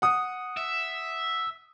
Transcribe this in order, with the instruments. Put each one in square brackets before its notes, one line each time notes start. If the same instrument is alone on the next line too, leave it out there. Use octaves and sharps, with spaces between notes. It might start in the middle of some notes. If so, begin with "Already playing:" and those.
[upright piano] F#5 D#6
[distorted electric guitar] E5